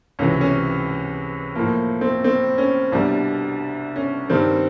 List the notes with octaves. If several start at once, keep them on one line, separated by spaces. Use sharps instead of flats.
C#2 C3 E3 C#4
C#4
A2 F3 A#3
C4
C4
C#4
C2 B2 G3 D4
C#4
G2 D#3 G3 C4